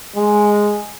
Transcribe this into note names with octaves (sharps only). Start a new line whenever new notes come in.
G#3